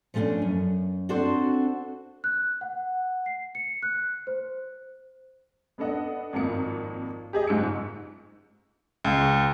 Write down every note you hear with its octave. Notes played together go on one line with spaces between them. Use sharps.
F3 G3 A3 B3 C#4 D4
F#2
C4 D4 F#4 A4 C5
F#6
F#5
C7
C#7
F#6
C5
B3 D4 A4 D#5 F#5
G#1 F2 A#3 C#7
G4 G#4 D#5
F#1 G#2 E6 C#7
C#2